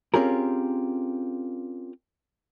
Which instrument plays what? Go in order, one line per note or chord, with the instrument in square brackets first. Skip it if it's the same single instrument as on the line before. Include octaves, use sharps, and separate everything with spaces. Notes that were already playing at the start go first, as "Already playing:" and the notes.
[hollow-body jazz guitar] C4 C#4 F4 G4 G#4 A#4